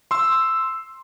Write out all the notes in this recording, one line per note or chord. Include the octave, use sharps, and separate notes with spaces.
C6 E6